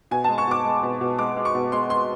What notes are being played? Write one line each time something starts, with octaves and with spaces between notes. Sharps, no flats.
B2 G#5
G#3 A5
C#6
B2 D6
G#3
B2
B2
G#3 D6
G#3
C#6
B2
G#3 C6
G#3 C6